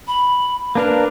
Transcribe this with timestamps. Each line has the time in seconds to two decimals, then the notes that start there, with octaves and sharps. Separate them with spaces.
0.08 B5
0.75 A#3 D4 A#4 B4